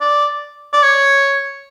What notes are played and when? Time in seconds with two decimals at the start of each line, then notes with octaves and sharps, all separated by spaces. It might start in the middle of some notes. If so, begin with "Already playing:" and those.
0.01 D5
0.73 D5
0.83 C#5